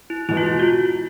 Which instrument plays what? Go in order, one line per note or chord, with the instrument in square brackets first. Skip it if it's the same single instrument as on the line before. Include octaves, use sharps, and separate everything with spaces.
[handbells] E4
[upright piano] E2 B2 G#3 B3 [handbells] E4
[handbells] F4
E4
F#4
F4